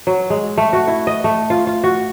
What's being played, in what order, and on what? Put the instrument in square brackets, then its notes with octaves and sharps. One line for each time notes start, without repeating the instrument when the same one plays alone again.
[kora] F#3
G#3
A3
F#4
E4
D#5
A3
F4
F4
F#4